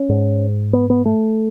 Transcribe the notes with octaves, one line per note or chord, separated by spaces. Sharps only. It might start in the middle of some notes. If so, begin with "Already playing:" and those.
Already playing: C#4
G#2
B3
B3
A3